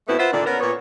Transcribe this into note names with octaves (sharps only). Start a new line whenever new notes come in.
B2 A3 B3 C4 E4
F4 B4 C5 E5 F#5
A#2 D3 D#3 D4
B3 C#4 A#4
A#2 B3 C#5